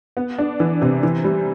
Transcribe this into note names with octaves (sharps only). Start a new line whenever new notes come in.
B3
D4
E3
C3
E3
G3